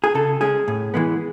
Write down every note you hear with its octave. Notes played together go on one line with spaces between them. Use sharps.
G#4
C#3 A4
G#3 C#4 G#4
A2
E3 G#3 B3